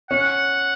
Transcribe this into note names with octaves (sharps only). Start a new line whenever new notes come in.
C#4 F#5